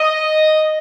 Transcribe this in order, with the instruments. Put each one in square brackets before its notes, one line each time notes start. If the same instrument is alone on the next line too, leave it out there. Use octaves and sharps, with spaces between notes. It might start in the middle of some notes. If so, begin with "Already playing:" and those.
Already playing: [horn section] D#5